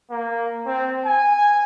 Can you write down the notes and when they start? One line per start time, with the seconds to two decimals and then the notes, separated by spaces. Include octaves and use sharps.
0.11 A#3
0.67 C4
1.06 G#5